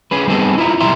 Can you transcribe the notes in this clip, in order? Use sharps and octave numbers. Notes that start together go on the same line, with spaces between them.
C#4 G#4 B4
G3 B3 C4 D#4 G#4 A4
E4 F4 E5 A#5
B1 E3 G3 E5 A#5 C6